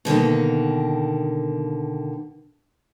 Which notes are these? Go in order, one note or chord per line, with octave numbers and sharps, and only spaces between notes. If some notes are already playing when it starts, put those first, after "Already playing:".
B2 D3 D#3 A#3